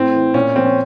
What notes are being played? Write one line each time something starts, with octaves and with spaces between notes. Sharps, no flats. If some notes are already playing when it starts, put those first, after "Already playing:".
Already playing: A2 C4
E3
A#2 C#4
F3 C4
C#4